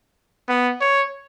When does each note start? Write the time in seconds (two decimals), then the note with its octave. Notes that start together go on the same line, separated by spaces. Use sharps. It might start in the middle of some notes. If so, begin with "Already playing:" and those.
0.49 B3
0.81 C#5